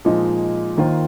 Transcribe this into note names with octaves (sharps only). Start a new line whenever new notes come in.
A#2 F3 G#3 D#4
D#2 D#3 A#3 F4 C5